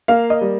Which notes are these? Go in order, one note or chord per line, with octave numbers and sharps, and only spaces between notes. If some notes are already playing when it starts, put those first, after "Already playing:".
A#3 F5
D#5
G3